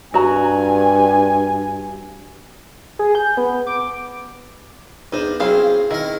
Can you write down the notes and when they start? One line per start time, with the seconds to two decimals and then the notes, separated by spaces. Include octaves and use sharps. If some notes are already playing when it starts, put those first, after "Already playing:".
0.14 G2 F#4 G#5 A#5
2.99 G#4
3.15 G6
3.37 B3
3.67 D6
5.12 E2 D4 D#4 C5
5.40 F#3 C4 C#4 E4 G#4 F5
5.91 D#3 E4 A#4